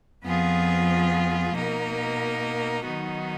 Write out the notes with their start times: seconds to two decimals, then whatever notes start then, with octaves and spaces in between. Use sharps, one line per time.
0.25 F2 F3 B3 F4 G#4
1.55 B2 A#3 D#4 A#4
2.84 D#3 F#3 B3 D#4 F#4